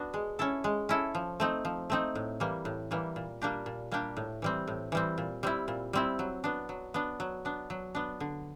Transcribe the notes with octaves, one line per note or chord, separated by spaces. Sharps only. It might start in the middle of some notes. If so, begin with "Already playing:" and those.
Already playing: B3 D4 F#4
G#3
C#4 E4 A4
G#3
C#4 E4 A4
F3
A3 C4 D#4
F3
A3 C4 D#4
A2
E3 G3 A#3
A2
E3 G3 A#3
A#2
G3 A#3 D4 G4
A#2
G3 A#3 D4 G4
A2
E3 G3 C4
A2
E3 G3 C4
A#2
G3 C4 E4
A#2
G3 C4 E4
F#3
B3 D4
F#3
B3 D4
F#3
B3 D4
F#3
B3 D4
D3